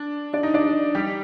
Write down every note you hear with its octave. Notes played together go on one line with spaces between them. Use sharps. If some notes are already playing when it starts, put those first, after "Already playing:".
Already playing: D4
D4 D5
D#4 D#5
D4 D5
G3 G4